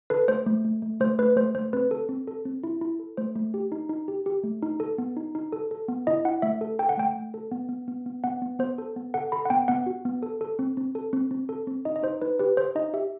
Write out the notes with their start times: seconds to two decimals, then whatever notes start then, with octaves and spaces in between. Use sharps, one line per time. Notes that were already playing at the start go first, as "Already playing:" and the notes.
0.10 A4 B4
0.28 A3 C5
0.46 A3
0.64 A3
0.82 A3
1.00 A3 C5
1.19 A3 B4
1.36 A3 C5
1.55 A3 C5
1.73 C4 B4
1.91 A4
2.09 C4
2.27 A4
2.45 C4
2.63 E4
2.81 E4
2.99 A4
3.17 A3 C5
3.36 A3
3.54 G4
3.72 D#4
3.90 D#4
4.08 G4
4.26 G4
4.44 A3
4.62 D#4
4.80 A4
4.98 B3
5.17 D#4
5.35 D#4
5.52 A4
5.71 A4
5.88 B3
6.07 E4 D#5
6.25 E4 F#5
6.42 A3 E5
6.61 A4
6.79 A4 G5
6.89 F#5
6.97 A3 G5
7.16 A3
7.34 A4
7.52 B3
7.69 B3
7.88 B3
8.06 B3
8.24 B3 F#5
8.42 B3
8.59 B3 C5
8.78 A4
8.96 B3
9.14 A4 F#5
9.32 A4 B5
9.45 F#5
9.50 B3 G5
9.68 B3 F#5
9.86 F#4
10.05 B3
10.23 A4
10.41 A4
10.59 C4
10.77 C4
10.95 A4
11.13 C4
11.31 C4
11.49 A4
11.67 C4
11.85 D#4 D#5
11.96 D#5
12.03 D#4 C5
12.22 D#4 B4
12.40 G4 B4
12.57 G4 C5
12.75 D#4 D#5
12.94 G4 E5